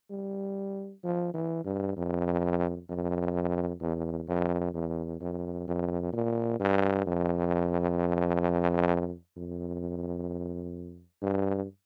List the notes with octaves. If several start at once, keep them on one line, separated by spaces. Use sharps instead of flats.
G3
F3
E3
G2
F2
F2
E2
F2
E2
F2
F2
A#2
G2
F2
F2
G2